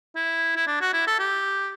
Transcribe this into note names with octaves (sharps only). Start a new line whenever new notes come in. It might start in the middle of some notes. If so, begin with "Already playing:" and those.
E4
E4
D4
F#4
E4
A4
G4